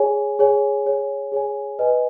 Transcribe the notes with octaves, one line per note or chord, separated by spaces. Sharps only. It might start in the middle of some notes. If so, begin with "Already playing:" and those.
Already playing: G#4 C#5 G#5
G#4 C#5 G#5
G#4 C#5 G#5
G#4 C#5 G#5
B4 D#5 G#5